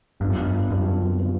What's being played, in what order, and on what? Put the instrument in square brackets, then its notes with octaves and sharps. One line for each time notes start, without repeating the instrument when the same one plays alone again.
[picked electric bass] G2 [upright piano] G3 B3 D4 F4
[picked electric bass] F#2
G2
[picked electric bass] F#2 [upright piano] G3 B3 D4 F4
[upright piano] G3 B3 D4 F4